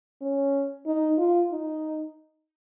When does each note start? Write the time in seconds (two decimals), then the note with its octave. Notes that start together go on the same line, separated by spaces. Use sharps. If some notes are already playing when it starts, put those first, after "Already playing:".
0.22 C#4
0.86 D#4
1.18 F4
1.52 D#4